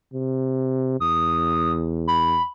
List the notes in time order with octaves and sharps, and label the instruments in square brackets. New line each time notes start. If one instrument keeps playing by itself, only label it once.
[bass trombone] C3
[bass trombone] E2 [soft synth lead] D#6
[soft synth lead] B5